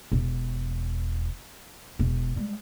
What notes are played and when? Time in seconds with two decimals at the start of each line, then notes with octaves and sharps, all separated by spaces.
0.12 E1
1.99 E1
2.36 G3 G#3